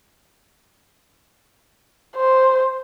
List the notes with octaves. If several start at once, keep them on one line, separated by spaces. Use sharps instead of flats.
C5